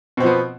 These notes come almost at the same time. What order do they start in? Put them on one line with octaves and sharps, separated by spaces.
B2 C4 F3 B3